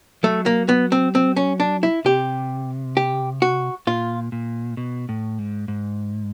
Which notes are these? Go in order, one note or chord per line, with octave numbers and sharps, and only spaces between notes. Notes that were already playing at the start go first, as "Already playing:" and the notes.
F#3 A3
A#3
B3
C4
C4
C#4
D4
E4
C3 G4
G4
F#4
A#2 F4
A#2
B2
A2
G#2
G#2